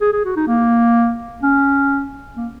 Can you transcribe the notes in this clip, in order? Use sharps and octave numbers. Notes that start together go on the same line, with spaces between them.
G#4
G#4
F#4
D#4
A#3
C#4
A#3